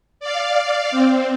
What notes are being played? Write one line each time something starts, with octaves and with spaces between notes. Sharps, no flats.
D5 F5
C4